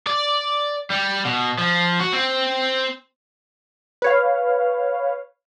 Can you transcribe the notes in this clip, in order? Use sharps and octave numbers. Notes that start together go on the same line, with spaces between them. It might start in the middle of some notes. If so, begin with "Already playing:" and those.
D5
G3
B2
F3
F#4
C4
B4 C#5 F5